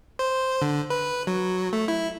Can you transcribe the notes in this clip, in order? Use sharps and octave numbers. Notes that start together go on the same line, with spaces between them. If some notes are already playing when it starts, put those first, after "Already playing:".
C5
D3
B4
F#3
A3
E4